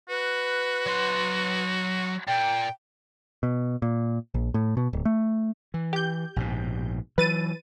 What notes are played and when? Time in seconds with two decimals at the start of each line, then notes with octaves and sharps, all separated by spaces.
0.09 F#4 B4
0.86 F#3 C6
2.27 A#2 G5
3.43 B2
3.82 A#2
4.34 A#1
4.54 A2
4.77 B2
4.93 D1
5.05 A3
5.74 E3
5.93 G4 G6
6.36 A#1 G#2 B2
7.18 E3 F#3 B4 A6 D#7